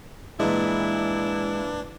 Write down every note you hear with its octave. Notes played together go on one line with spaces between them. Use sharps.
A#2 E3 G#3 D4 E4